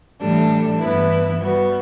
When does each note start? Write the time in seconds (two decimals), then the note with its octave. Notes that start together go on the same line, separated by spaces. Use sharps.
0.21 A2 E3 G3 D4 A4
0.80 G2 E3 B3 E4 B4
1.39 G3 B3 F#4